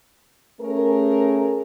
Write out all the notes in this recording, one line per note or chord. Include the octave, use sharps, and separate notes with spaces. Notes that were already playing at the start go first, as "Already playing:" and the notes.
A3 C#4 G#4 A#4